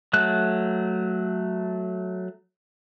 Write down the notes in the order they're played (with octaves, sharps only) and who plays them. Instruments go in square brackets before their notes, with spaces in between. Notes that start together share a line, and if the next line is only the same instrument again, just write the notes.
[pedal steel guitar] F#3 A3 F#6